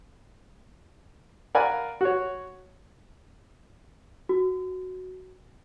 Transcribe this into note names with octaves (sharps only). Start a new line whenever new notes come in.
A#4 D5 F5 F#5 G#5 B5
F#4 C#5
F#4